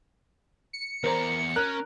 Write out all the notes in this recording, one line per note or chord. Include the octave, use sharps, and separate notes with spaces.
C#7
E2 A#4 C5 D5 A#5
C#4 A#4 F#6